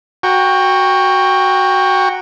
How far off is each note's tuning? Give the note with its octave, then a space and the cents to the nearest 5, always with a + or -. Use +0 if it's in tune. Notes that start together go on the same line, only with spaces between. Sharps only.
F#4 +0 G5 +20 A#5 +0